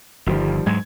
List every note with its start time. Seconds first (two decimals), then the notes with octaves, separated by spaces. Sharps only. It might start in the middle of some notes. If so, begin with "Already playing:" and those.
0.26 G1 D#3 F3 G3
0.66 G#2 F#3 G#3 G#6